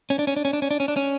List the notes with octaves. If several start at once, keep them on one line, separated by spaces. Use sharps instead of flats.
C#4
D4
C#4
D4
C#4
D4
C#4
D4
C#4
D4
C#4